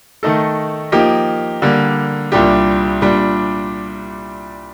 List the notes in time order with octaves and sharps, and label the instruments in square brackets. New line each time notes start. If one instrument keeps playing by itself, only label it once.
[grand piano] D#3 A3 D#4 A4
F3 A#3 D#4 G4
D3 G3 A#3
C2 A#2 G3 D4 G4
A#2 G3 D4